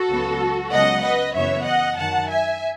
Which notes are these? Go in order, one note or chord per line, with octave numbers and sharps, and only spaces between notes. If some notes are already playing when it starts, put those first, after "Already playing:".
Already playing: F#4 A4
C#2 C#3 F#3 B3
C#2 C#3 F#3 B3 D#5 F#5
B4 D#5
F#2 C#3 E3 B3 C#5 E5
D#5 F#5
F#2 D#3 F#3 F#5 A5
E5 G#5